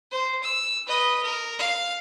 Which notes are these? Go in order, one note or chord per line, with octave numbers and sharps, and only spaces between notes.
C5
E6
B4 D#5
A#4
F5